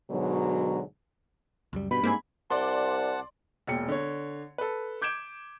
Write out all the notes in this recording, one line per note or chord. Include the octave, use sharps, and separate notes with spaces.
G#2 B2 D3 F#3
C#2 F#2 G3
G2 B2 B5
G#2 A#3 C4 G#5
C2 D5 F#5 A5 C6
E1 A#2 G5 C#7
D3 C#5
A4 B4
D6 G6 G#6 D7 E7